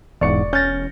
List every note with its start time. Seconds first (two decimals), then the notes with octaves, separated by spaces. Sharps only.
0.21 E1 E2 G#2 D5 C#6 C#7
0.53 C#4 F6 G6 A6 A#6